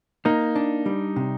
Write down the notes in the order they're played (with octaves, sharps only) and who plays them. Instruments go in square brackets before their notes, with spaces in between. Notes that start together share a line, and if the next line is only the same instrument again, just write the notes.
[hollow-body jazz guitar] A#3 [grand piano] D#4
[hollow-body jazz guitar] D4
G3
C3